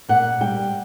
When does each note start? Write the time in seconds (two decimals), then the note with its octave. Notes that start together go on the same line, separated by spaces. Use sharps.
0.09 A#2 F#5
0.41 G3 G5